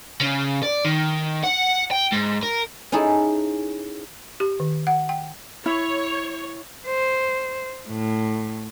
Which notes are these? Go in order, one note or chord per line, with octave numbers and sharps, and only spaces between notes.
C#3
D5
D#3
F#5
G5
G#2
A#4
C#4 D#4 E4 G#4 A4
G4
D#3
F#5
G5
E4 C#5
C5
A2